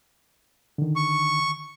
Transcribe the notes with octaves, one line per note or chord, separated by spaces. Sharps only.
D3 D#3
C#6